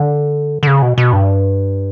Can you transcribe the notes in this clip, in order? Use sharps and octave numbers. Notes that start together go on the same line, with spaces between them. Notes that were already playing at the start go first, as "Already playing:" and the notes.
Already playing: D3
D3
C#3
B2
B2
G2